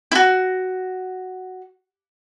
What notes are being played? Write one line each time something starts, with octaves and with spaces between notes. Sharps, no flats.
E4 F#4